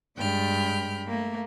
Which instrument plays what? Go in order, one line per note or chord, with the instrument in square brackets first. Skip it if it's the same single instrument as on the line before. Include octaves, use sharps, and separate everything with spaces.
[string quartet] G2 G#3 G5 B5 F6
A3 A#3